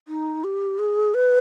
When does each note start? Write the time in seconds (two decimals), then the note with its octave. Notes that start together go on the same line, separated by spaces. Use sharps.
0.08 D#4
0.44 G4
0.79 G#4
1.14 B4